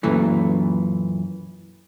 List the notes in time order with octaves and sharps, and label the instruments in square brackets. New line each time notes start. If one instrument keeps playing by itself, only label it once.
[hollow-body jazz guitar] F#2 A#2 E3 A3